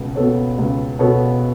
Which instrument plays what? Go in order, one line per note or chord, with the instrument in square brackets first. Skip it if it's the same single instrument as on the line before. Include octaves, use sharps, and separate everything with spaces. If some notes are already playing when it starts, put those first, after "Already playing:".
Already playing: [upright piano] C#2 B2 B3
B2 B3 A4 C#5
C#2
B2 B3 A4 C#5